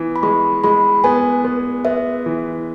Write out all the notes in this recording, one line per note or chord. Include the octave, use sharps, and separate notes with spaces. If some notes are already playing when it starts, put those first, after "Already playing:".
Already playing: E3 B3
B5
G#3 C#6
G#3 B5
B3 G#5
B3
B3 E5
E3